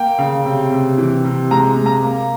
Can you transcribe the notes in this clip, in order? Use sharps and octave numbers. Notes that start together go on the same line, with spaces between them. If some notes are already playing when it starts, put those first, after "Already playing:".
Already playing: A#3 G5
C#3
C3
C3
E3
C3
G#3 A#5
G#3
A#5
A#3